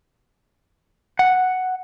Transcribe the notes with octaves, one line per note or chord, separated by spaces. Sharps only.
F#5